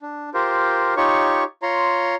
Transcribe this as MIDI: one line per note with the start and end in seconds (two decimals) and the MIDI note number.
0.01 0.30 62
0.34 0.94 65
0.34 0.94 67
0.34 0.94 70
0.34 0.94 72
0.97 1.44 63
0.97 1.44 65
0.97 1.44 67
0.97 1.44 73
0.97 1.44 85
1.63 2.15 65
1.63 2.15 73
1.63 2.15 82
1.63 2.15 84